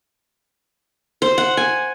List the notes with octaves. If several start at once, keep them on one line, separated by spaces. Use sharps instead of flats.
C5
F#5
G#5